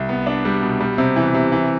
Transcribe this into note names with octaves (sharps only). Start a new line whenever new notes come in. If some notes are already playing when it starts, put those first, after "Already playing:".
Already playing: C2
B3
D4
G3
B2
G3
C3
E3
C3
E3